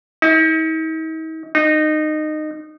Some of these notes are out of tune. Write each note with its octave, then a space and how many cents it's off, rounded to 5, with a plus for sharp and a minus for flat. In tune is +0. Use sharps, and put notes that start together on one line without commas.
D#4 +45
D#4 -20